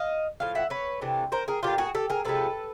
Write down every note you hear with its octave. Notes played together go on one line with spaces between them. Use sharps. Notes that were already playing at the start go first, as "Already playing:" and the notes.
Already playing: D#5 F5
A2 F3 F5
E5 F#5
B4 C#5
C3 E3 A3 D4
A#4 C5
G#4 A#4
A2 F3 A#3 D4 F4 G4
F#4 G#4
G4 A4
G#4 A#4
C3 F3 G#3 B3 A4 B4